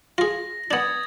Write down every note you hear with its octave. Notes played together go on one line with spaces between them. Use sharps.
F4 G#4 A#6
B3 D4 D#6 G#6 A6